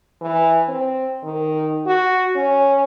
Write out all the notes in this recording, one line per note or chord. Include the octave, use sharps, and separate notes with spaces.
E3
C4
D#3
F#4
C#4